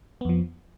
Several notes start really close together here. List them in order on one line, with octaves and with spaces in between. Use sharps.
B3 F2 F3